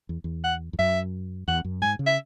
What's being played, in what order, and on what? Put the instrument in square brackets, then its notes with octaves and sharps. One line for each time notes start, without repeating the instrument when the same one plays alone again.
[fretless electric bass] E2
E2
[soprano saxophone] F#5
[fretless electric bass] E2
[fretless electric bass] F#2 [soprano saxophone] E5
[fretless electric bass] E2 [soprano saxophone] F#5
[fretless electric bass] F#2
[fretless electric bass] G#2 [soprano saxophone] G#5
[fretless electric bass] C#3
[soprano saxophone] E5